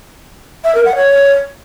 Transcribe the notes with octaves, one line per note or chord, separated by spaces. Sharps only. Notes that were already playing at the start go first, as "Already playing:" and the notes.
E5
A#4
F#5
C#5